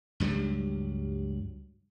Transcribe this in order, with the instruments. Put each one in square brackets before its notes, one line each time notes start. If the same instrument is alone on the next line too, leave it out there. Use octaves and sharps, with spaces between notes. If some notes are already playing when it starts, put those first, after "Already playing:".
[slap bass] C#2 G2 F#3 G3